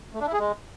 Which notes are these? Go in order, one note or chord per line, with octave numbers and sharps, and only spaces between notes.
A3
D4
E4
G#4
G#3